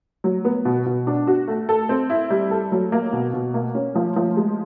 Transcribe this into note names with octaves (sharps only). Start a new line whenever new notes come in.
F#3
B3
B2
B2
D4
F#4
A3
A4
C4
E4
G3
A4
F#3
A#3
B2
B2
A#3
C#4
F3
F3
G#3